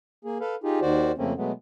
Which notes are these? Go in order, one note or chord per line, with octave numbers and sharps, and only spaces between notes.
A#3 G#4
A4 B4 F5
D#4 F4 G4 G#4
D#2 D#3 F#4 C5 D5
F2 C#3 A3 A#3 C4 C#4
B2 F#3 G#3 A3 B3